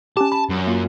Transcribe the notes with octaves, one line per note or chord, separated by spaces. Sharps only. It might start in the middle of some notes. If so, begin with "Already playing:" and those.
C#4 G4 A5
B5
F#2
A#3 F4